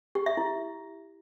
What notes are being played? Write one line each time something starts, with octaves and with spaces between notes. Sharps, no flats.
G4
E5
E4